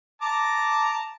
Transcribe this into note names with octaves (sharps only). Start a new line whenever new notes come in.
A5 A#5 D6